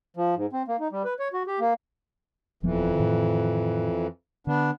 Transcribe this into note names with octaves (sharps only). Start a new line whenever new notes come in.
F3
G#2
C4
A#3
D#4
G3
B4
C#5
F#4
G4
A#3
D#1 F2 E3 F3 B3
A2 D#3
D3 B3 D4